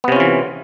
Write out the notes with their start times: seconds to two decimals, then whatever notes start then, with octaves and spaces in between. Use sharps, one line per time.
0.04 B3
0.08 C3
0.12 C#4
0.16 F4
0.20 E3